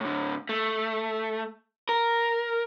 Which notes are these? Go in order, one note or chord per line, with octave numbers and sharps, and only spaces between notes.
A2 D3
A3
A#4